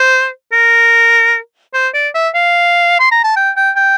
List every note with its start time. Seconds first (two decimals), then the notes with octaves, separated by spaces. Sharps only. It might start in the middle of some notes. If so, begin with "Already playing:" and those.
Already playing: C5
0.53 A#4
1.74 C5
1.94 D5
2.15 E5
2.35 F5
3.00 C6
3.12 A#5
3.24 A5
3.37 G5
3.57 G5
3.76 G5